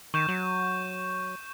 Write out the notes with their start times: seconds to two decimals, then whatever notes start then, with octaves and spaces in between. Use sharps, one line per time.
0.14 D#3 C#6 G6 E7
0.28 F#3